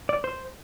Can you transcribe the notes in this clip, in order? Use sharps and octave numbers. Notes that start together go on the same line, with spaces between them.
D5
C5